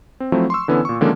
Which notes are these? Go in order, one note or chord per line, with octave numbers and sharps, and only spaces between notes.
C4
F3 F#3 A3 C4 E4
C6 C#6 E6
D3 E3 B3 C#4
A#2 C#6
D3 D#3 F3 G#3 A#3 C#4